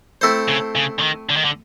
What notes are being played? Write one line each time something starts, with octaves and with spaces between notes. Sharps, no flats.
A3 C4 E4 A4 C5
C#3
C#3
D3
D#3
D3
D#3
D3